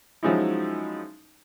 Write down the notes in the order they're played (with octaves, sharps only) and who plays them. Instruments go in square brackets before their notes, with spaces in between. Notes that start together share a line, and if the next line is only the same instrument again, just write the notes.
[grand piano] F3 F#3 G#3 C#4 D#4 E4